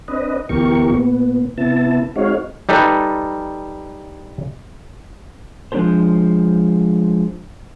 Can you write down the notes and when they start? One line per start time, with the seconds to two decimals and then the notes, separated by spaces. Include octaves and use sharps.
0.08 C4 D4 B4 D#5
0.49 D2 B2 E3 G4 A#4 C#6
0.91 A#2 B3
1.58 C3 B3 E4 A5
2.16 G#3 C4 D#4 F#4 C#5 F5
2.69 G3 D#4 A4 B4
5.72 F3 G#3 D4 G4 A4 C5